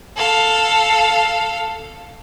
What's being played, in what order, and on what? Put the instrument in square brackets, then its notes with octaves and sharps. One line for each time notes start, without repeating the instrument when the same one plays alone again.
[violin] A4 F5